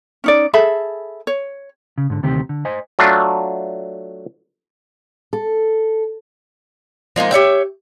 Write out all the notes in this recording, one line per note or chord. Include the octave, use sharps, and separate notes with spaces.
C#4 D#4 D5
G#4 A4 E5 B5
C#5
C#3
G#2 D3
D2 C3 D#3 C4 G4
D3
C5 D#5 G#5
F#3 A3 D4 F4
A4
F3 G#3 A#3 D#4
G4 C#5 E5 G5